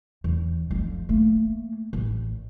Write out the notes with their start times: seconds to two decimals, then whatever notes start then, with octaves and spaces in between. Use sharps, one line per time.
0.24 E2
0.71 F2 F3
1.09 A3 A#3
1.93 A1